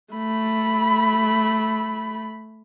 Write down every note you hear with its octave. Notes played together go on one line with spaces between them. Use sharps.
A3 B5